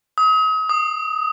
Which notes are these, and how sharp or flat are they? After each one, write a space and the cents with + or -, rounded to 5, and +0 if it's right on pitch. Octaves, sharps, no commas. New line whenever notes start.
D#6 +40
D#6 -10